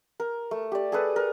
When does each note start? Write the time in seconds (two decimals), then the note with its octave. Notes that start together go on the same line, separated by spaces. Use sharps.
0.20 A#4
0.51 A3
0.72 G4 D5
0.92 G#4 A4 B4
1.16 A#4